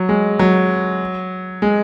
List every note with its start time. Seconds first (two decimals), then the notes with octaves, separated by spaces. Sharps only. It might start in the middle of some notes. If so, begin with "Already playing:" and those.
Already playing: F#3
0.09 G#3
0.39 F#3
1.62 G#3